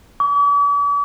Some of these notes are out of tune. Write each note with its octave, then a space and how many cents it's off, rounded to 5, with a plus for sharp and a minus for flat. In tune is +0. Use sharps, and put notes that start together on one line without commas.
D6 -45